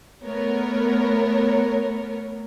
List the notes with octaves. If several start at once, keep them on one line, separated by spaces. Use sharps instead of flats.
A3 B3 A#4 C#5